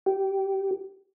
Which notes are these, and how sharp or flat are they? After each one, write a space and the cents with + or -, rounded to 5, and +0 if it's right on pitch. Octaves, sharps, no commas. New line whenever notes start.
G4 -15